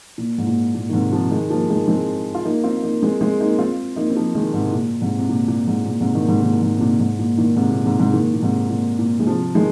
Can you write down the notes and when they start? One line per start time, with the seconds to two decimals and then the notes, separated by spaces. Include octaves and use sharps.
0.18 A#2
0.38 G#2
0.47 A#2
0.74 A#2
0.89 D#3
0.93 G#2 C3
1.13 C3 F3
1.31 D#3 G#3
1.50 F3 A#3
1.70 D#3 G#3
1.88 G#3 C4
2.35 F4
2.45 A#3 D#4
2.64 C4 F4
2.83 A#3 D#4
3.02 G#3 C4
3.20 G#3 C4
3.40 A#3 D#4
3.59 C4 F4
3.96 A#3 D#4
4.10 C4
4.16 F3 A#3
4.35 D#3 G#3
4.53 G#2 C3
4.72 A#2
5.01 G#2 C3
5.18 C3
5.29 A#2
5.48 A#2
5.67 G#2
5.86 A#2
6.01 G#2 C3
6.15 A#2 D#3
6.28 G#2 C3
6.43 A#2 D#3
6.62 G#2
6.77 C3
6.81 A#2
6.99 G#2
7.19 A#2
7.37 A#2 D#3
7.56 G#2 C3
7.70 A#2
7.85 G#2 C3
7.99 G#2 C3
8.13 A#2 D#3
8.33 A#2
8.42 G#2 C3
8.70 A#2
8.99 A#2
9.19 G#3
9.27 C3 F3
9.55 D#3 G#3